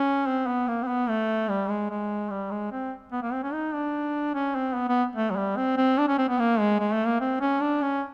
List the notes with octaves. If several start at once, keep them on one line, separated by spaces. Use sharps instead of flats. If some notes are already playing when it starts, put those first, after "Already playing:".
Already playing: C#4
C4
B3
A#3
C4
B3
A3
G3
G#3
G#3
G3
G#3
C4
B3
A#3
C4
C#4
D#4
D4
C#4
C4
B3
B3
A3
F#3
G3
C4
C4
D4
C#4
C4
B3
A#3
G#3
G#3
A3
A#3
C4
C#4
D4
C#4